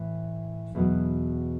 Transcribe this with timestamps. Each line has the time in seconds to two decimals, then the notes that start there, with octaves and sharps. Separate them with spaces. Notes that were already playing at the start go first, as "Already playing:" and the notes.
Already playing: A2 E3
0.75 E2 B2 F#3 B3